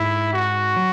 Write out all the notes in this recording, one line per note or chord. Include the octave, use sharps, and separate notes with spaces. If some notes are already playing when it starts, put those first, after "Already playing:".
Already playing: G#2 E4
F#4
F#3